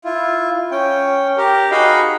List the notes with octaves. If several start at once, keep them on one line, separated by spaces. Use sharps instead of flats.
E4 F4
C#4 G5
G4 A#4
D#4 F#4 G#4 D#5 F5 B5